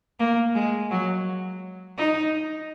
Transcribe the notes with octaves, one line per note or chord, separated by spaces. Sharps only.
A#3
G#3
F#3
D#4